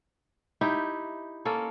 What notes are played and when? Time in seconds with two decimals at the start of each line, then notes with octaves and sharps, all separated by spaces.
0.61 D#4 E4 G4
1.45 A#3 C#4 A4